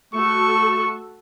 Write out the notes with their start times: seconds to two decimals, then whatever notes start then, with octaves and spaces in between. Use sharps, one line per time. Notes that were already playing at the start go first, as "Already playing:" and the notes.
0.14 A3 F#4 A4 C#6